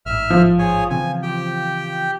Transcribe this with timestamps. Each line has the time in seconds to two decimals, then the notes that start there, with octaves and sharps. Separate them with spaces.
0.06 A1 G#2 E5 F6
0.30 F3
0.59 G#4 C#5 G#5
0.90 C#3 E3 C4 G#5
1.23 G4 G5